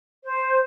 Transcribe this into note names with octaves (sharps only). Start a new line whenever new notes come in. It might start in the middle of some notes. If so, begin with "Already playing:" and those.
C5